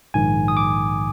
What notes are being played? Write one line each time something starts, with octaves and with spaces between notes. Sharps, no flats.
A#1 G#2 D#3 G#5
D#6
D6